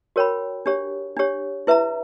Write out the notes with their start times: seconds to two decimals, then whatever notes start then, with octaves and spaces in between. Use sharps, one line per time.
0.16 F#4 A#4 C#5 G5 B5
0.66 D4 G4 C#5
1.17 D4 G4 C#5
1.67 E4 B4 E5 A#5